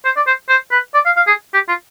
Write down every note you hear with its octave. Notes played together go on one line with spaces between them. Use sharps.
C5
D5
C5
C5
B4
D5
F5
F5
G#4
G4
F4